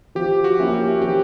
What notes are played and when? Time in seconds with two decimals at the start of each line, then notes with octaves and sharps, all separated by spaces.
0.15 F3 G4
0.44 F#4
0.59 A#3 C#4 E4
0.74 G4
1.02 F3 G4